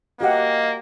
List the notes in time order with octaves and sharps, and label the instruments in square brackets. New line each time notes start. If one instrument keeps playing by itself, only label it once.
[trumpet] A#3 [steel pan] F#4 G4 F#5 [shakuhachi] D#5